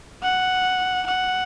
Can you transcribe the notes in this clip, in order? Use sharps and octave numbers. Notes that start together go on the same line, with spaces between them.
F#5
F#5